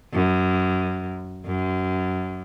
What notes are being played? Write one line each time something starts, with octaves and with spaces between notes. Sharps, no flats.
F#2
F#2